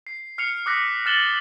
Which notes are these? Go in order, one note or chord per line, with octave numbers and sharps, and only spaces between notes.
C7
F6 C7 C#7 F7
D6 D#6 F#6 A#6 B6
F6 F#6 A6 E7 F#7 G7